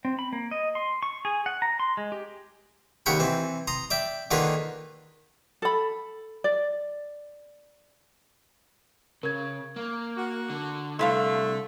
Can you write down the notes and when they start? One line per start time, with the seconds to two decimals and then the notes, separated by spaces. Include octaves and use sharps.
0.05 C4
0.19 B5
0.33 A#3
0.51 D#5
0.75 C6
1.03 C#6
1.25 G#4
1.46 F#5
1.62 A#5
1.80 C6
1.97 G#3
2.12 G4
3.06 D#2 C#3 C#5 F#5 G5 B5
3.19 E3 C4
3.67 A#5 C6 D#6
3.90 D5 E5 G5
4.31 D3 D#3 A#3 F4 G#4 B4
5.62 A4 B5
6.44 D5
9.23 C#3 A#4 G#6
9.76 A#3
10.17 F#4
10.50 D3
10.99 C2 D3 A3 E4 B4 F5 C6